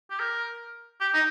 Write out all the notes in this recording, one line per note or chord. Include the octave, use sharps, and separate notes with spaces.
G4
A#4
G4
D#4